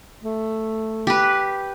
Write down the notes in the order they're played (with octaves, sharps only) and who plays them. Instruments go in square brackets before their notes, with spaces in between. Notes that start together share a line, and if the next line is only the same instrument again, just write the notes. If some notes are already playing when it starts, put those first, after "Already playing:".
[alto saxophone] A3
[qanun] G4 B4